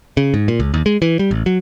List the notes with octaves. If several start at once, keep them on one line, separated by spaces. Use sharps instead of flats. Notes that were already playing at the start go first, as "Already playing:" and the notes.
C#3
G#2
A#2
C#2
D#2
G#3
E3
G3
A1
F#3